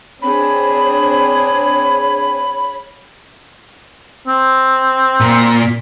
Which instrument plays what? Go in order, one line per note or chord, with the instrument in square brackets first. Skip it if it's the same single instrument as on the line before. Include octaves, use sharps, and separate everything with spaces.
[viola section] C4 D4 G#4 [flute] C#5 [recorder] B5
[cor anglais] C4
[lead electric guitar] A#2